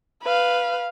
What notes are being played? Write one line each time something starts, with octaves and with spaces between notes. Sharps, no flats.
B4 F5